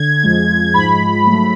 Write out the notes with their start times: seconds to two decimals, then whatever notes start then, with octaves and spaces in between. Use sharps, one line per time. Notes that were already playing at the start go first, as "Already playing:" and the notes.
Already playing: D3 G#6
0.23 F2 F3 G#3
0.74 G#2 F3 G#3 B5
1.25 G#2 F#3 A3